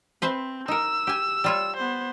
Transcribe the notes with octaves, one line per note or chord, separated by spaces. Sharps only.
C4 B4 C5 E5
D#4 A#4 E6
G4 G#5
G3 F4 C#5
B3 C5